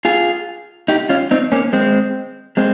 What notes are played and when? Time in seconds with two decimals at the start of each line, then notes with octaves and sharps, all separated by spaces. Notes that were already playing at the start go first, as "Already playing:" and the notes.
0.05 F4 G#4
0.88 D#4 G4
1.09 C#4 F4
1.31 C4 D#4
1.52 A#3 C#4
1.73 G#3 C4
2.57 G#3 C4